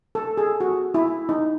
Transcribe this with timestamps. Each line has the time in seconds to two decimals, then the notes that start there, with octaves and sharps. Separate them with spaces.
0.15 A4
0.37 G#4
0.60 F#4
0.94 E4
1.29 D#4